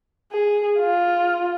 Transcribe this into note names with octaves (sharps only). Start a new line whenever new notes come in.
G#4
F4